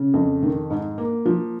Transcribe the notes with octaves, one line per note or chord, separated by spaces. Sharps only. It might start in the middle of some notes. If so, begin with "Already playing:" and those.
Already playing: C#3
F2
D#3
G#2
A#3
F3